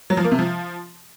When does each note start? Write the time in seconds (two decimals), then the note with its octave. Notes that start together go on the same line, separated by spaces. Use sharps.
0.10 F#3
0.17 F3
0.24 A#3
0.32 C3
0.39 F3